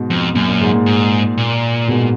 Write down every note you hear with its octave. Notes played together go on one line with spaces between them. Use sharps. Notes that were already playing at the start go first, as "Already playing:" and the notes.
Already playing: G#2 B2
F2
F#2 A#2
A#2
G#2
A#2
G#2
A#2
G#2 B2